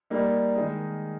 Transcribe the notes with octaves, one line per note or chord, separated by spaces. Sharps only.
G3 A#3 D#4
D#3 G#3 D#4